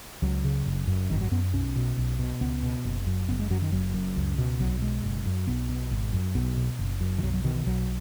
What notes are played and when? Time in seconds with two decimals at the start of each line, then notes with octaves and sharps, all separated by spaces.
0.22 C#2 F#3
0.44 C#3
0.66 F#1
0.88 F#2
1.10 G#1 D#3
1.21 F#3
1.31 F#2 B3
1.53 B1 C#4
1.76 B2
1.98 B1
2.19 B2
2.41 C#2 B3
2.63 B2
2.85 F#1
3.07 F#2
3.29 F#1 B3
3.39 G#3
3.50 F#2 F#3
3.62 D#3
3.72 F#1 F#3
3.94 F#2
4.16 C#2
4.38 B2
4.60 B1 F#3
4.82 B2 G#3
5.04 F#1
5.26 F#2
5.47 B1 B3
5.69 B2
5.91 G#1
6.13 F#2
6.35 B1 B3
6.57 B2
6.79 F#1
7.01 F#2
7.18 D#3
7.23 B1 F#3
7.34 F#3
7.44 B2 D#3
7.56 D#3
7.66 B1 F#3